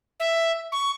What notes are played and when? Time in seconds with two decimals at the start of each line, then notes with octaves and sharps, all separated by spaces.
0.20 E5
0.72 C#6